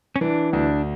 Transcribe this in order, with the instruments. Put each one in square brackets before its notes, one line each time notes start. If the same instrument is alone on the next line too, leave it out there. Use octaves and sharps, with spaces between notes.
[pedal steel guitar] C#4
[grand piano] E3 [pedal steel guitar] D4
[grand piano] D2 [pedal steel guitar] D4